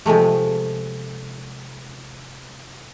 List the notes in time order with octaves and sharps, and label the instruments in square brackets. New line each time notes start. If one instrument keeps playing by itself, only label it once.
[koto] C3 F3 G#3 A3